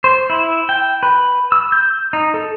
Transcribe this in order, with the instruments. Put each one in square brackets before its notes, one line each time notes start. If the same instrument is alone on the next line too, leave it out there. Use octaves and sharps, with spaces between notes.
[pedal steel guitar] C5
E4
G5
B4
E6
G6
D#4
A4